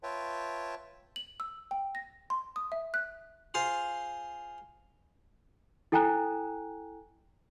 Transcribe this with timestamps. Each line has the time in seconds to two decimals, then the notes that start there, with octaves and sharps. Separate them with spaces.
0.03 F4 B4 C#5 E5 G5 A5
1.16 F#7
1.40 E6
1.71 G5
1.95 A#6
2.30 C6
2.56 D#6
2.72 E5
2.94 F#6
3.54 F4 G#4 C5 F5
5.92 E4 A4 G5 G#5 A#5 F#6